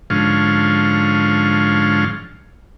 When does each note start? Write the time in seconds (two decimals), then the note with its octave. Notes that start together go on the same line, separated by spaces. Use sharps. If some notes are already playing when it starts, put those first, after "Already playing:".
0.10 G#2 D3 F3 C#4 F5